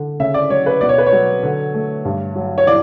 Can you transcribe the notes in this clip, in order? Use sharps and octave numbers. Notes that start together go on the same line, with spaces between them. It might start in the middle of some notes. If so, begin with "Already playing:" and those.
Already playing: D3
C#3 E5
D5
F#3 C#5
B4
B2 D5
C#5
B4
C#5
F#3
D3
A3
G2
F#3
C#5
E3 D5